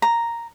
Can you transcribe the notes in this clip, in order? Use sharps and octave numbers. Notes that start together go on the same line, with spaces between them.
A#5